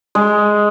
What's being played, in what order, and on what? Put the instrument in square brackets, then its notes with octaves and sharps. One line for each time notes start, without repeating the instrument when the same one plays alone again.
[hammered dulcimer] G#3